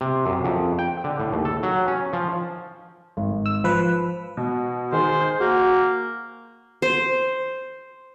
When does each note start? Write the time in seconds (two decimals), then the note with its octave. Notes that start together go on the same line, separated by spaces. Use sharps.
0.01 C3
0.26 F#2
0.45 F2
0.79 G5
1.04 D3
1.20 A2
1.32 D#2
1.45 A4
1.63 F#3
1.88 C#4
2.13 F3
3.17 G#1
3.46 E6
3.64 F3 B4
4.37 B2
4.93 D#3 G#4 C5
5.21 G6
5.40 A#3 F#4
6.82 C5